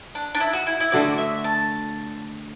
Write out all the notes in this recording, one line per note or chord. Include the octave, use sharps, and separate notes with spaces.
D4
D4
E4
F#4
E4
E4
D3 A3 F#4 D5
E5
A5